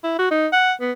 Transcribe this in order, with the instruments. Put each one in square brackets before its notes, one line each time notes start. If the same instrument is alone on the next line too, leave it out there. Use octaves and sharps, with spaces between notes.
[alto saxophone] E4
F#4
D#4
F#5
B3